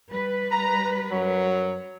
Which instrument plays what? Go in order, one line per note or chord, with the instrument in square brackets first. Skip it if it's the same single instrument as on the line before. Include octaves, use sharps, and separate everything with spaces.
[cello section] G3 B4
[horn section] A#5
F#2 F#3